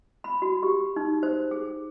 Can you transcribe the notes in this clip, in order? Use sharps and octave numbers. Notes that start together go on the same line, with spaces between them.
B5
F#4
G4
D#4
C5
G#4